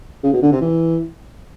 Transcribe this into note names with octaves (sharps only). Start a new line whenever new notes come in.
C#3
B2
D3
C3
E3